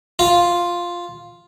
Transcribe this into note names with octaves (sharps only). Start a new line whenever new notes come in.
F4